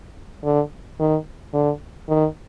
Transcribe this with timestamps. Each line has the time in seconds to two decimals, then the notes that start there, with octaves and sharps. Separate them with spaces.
0.44 D3
0.99 D#3
1.53 D3
2.09 D#3